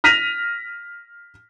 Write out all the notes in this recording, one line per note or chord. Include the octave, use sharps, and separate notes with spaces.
F6 A#6 B6 D#7 F7